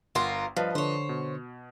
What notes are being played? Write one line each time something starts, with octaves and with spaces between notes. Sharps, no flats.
G1 F4 A#4 F#5 C6
G2 F3 B4 D#5 F5
D3 C5 C#5
B2